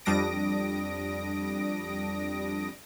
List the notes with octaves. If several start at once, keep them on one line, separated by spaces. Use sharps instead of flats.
F2 G3 D4 D#6 A#6 D7